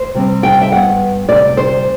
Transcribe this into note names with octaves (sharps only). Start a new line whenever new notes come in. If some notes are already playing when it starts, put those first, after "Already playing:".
Already playing: C5
C3 G3 C4
G5
E5
G2 E3 B3 F#5
D2 C3 G3 D5
C5